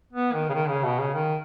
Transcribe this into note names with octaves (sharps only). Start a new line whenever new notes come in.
B3
D#3
C#3
D#3
C#3
B2
C#3
D#3